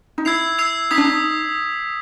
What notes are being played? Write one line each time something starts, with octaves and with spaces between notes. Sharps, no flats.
D#4
E4 E6 G#6 C7 F7
E6 G#6 C7 F7
D#4 D#6 G#6 B6
D4
D#4